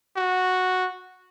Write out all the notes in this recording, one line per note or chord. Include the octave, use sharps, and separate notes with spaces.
F#4